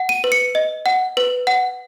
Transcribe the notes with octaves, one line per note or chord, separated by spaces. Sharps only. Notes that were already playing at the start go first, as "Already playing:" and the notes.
Already playing: F#5
D#7
B4
C#7
D#5
F#5
B4
F#5